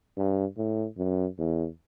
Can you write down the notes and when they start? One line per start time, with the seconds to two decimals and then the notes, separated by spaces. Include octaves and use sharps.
0.17 G2
0.58 A2
0.98 F#2
1.38 E2